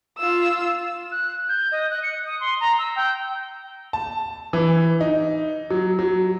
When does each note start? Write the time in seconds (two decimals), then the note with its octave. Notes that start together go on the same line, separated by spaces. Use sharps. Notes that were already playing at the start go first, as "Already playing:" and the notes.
0.18 F4 E6
1.11 F#6
1.49 G6
1.71 D#5
1.90 F#6
2.03 C#7
2.26 D#6
2.40 C6
2.60 A#5
2.78 E6
2.96 G5
3.93 A5
4.53 E3
5.01 D#4
5.70 F#3
5.99 F#3